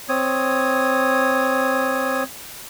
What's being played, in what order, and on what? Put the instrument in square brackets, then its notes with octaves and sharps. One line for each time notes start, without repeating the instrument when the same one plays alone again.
[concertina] C4 C#5 D#6